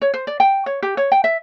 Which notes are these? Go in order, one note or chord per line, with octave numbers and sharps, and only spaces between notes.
C#5
C5
D5
G5
C#5
G4
C#5
G5
E5